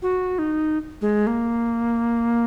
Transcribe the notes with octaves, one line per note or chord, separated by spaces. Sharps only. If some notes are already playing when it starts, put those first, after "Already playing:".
F#4
D#4
G#3
A#3